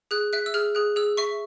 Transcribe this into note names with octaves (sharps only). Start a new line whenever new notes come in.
G#4 F#6
E5 F#6
E6
G#4 F6
G#4 F#6
G#4 E6
E5 C#6